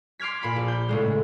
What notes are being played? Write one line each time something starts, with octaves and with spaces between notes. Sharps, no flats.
C6 D6 F6 G#6 B6
A#2 B5 B6
A#1
G6
A2 C#3 G#3